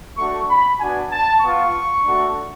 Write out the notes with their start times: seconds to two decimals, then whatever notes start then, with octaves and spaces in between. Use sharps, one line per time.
0.17 A3 D4 F#4 C#6
0.49 B5
0.80 B3 D4 F#4 G#5
1.12 A5
1.42 B3 F4 C#6
2.04 A3 D4 F#4